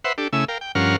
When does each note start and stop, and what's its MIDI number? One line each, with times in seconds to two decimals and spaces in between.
0.04 0.13 71
0.04 0.13 72
0.04 0.13 76
0.04 0.13 78
0.18 0.28 62
0.18 0.28 67
0.18 0.28 69
0.33 0.45 49
0.33 0.45 57
0.33 0.45 64
0.33 0.45 80
0.33 0.45 88
0.48 0.58 70
0.48 0.58 77
0.48 0.58 79
0.61 0.72 79
0.75 0.96 43
0.75 0.96 53
0.75 0.96 61
0.75 0.96 70
0.75 0.96 78
0.75 0.96 89